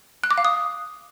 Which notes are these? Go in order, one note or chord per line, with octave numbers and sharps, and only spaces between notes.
F#6
D6
F5
D#6